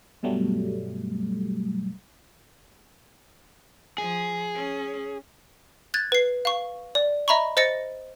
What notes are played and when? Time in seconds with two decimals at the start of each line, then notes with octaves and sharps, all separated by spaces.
0.23 G2 B2 F#3 G3 A3
3.98 F3 G#4
4.55 C#4
5.94 F#6 G#6 A6
6.12 B4 C7
6.45 F5 C#6
6.95 D5
7.28 D#5 E5 A#5 B5 C#6
7.57 C5 D#5 A6 A#6 C#7